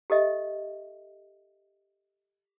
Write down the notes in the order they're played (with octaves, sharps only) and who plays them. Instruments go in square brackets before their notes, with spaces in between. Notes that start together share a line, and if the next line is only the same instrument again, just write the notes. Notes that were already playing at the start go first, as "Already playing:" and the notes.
[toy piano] G4 A4 D#5 E5